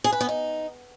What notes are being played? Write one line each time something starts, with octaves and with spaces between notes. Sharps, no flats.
G#4
B4
B3
D#4